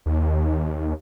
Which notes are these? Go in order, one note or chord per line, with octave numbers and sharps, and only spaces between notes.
D#2